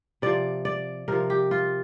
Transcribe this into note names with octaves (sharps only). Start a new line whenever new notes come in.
C3 F3 D5
D5
C3 F3 A#4
G4
F4